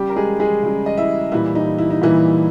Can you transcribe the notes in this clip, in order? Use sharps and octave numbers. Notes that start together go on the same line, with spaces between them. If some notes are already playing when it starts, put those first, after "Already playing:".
Already playing: C#3 G3 G4
A#4
G#3 G#4
G#3 G#4
C#3 G3
D#5
E4 E5
A#2 E3 G3 E4
D#4
E4
D#4
A#2 E3 G3 E4